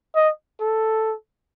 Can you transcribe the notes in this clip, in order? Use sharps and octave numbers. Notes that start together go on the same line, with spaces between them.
D#5
A4